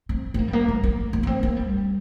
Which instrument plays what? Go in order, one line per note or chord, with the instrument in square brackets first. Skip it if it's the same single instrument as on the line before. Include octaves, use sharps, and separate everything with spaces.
[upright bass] C4
C4
A#3
G3
A#3
G3
A#3
A#3
A#3
C4
A#3
G3